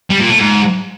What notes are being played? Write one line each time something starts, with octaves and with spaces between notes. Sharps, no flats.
G3
A#2
A3
G#2